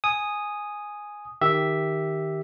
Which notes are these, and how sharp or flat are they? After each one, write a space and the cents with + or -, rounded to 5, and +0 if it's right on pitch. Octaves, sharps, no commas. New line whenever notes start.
G#5 +0 D#6 -5
D#3 +0 G4 +0 E5 +0